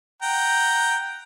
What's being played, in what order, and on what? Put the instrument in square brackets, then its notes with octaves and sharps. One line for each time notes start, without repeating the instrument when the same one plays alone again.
[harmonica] F#5 G5 A#5